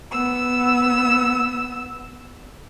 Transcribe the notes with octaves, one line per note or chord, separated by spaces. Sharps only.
B3 E6